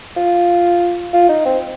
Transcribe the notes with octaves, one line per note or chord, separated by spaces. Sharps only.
F4
F4
D#4
C4